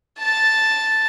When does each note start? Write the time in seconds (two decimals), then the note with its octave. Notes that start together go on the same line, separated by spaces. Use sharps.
0.19 A5 A6